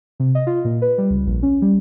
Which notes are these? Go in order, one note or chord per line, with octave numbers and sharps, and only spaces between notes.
C3
D#5
F4
A#2
B4
G3
C#2
A#1
C#4
G3